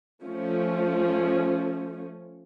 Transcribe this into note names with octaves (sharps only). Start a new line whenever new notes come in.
F3 A3 C#4